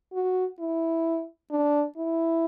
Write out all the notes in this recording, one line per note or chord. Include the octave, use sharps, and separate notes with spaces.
F#4
E4
D4
E4